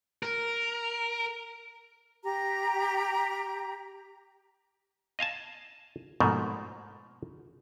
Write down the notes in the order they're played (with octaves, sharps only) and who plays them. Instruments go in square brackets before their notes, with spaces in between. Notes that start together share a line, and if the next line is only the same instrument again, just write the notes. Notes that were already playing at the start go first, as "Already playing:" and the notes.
[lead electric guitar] A#4
[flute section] G4 A#5
[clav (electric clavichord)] D#5 F5 G#5 A5
G#2 B2 F3 A3 A#3